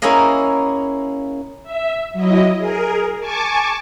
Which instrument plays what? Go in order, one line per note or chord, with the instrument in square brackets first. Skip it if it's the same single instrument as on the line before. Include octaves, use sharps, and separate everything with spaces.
[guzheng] A#3 C#4 E4 G#4 D#5 F5
[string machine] E5
F#3 E4 D#5
G#4 A#4
G#5 A5 C#6 D6